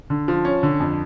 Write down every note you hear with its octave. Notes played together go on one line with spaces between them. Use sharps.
D3
F3
C#4
D3
F2